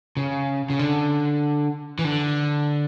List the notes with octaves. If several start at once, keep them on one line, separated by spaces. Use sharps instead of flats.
C#3
C#3
D3
E3
D3